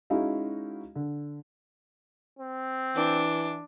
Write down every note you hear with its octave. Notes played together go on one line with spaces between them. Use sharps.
G#3 C#4 D#4 E4 F#4 F5
D3
C4
E3 D4